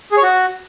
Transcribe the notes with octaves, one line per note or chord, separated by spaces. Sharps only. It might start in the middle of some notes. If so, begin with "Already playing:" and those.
G#4
C#5
F#4